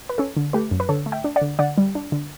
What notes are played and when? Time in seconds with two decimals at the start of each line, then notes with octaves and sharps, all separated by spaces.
0.09 B4
0.18 C#4 A4 C#5
0.37 D3
0.53 A3 G4 B4
0.71 F#2
0.80 B4
0.89 D3 A4 C#5
1.06 A3
1.12 E5 G5
1.24 D4
1.36 D5 F#5
1.41 D3
1.59 D3 D5 F#5
1.78 G3
1.95 D4
2.12 D3